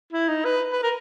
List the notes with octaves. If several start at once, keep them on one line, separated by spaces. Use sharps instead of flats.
E4
D#4
B4
B4
A#4